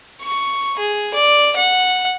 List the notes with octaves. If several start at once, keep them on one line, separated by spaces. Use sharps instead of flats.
C#6
G#4
D5
F#5